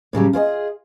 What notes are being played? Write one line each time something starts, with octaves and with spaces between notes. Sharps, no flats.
A2 C#3 F#3 G3
F4 G#4 C5 D#5